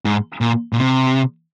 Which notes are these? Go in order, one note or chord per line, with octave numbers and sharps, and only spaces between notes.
G#2
A#2
A#2
C3